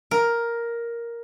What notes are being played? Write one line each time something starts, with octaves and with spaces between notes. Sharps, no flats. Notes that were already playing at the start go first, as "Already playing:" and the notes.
A#4